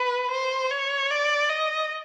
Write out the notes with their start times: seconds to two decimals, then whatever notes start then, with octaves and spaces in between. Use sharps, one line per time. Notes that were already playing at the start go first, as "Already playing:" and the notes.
Already playing: B4
0.31 C5
0.71 C#5
1.10 D5
1.50 D#5